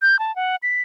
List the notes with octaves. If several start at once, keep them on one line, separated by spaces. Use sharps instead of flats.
G6
A5
F#5
B6